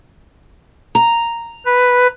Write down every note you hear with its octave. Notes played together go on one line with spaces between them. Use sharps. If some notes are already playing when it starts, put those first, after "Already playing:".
A#5
B4